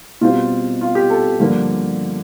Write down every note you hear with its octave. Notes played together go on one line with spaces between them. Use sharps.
B2 G3 C4 F4
F4
G4
A4
G2 D3 F3 A#3